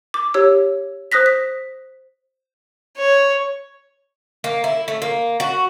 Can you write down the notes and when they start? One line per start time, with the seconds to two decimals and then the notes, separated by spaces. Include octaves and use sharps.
0.14 D6
0.34 G4 C#5 E6
1.12 C5 D#6 F#6 A#6 B6
1.26 B6
2.98 C#5
4.44 A#3
4.64 E4
4.88 A3
5.02 A#3
5.40 F#4